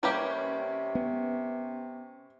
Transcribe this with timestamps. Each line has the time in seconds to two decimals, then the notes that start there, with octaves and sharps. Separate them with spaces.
0.03 C3 G3 A#3 C#4 G4 B4
0.95 B3